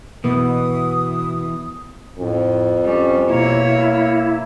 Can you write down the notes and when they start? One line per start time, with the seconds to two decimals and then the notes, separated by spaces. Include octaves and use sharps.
0.24 B2 E3 B3 D#6
2.19 F2 A2
2.85 G3 C#4
3.29 B2 A#3 E4 C#5